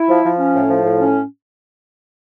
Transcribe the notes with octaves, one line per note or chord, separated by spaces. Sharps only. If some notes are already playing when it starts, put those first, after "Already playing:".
Already playing: E4
F3
F3
C#4
A2
F3
A2
C#4